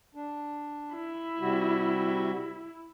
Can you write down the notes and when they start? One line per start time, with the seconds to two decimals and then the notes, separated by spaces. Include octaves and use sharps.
0.15 D4
0.96 E4
1.40 C3 G3 F#4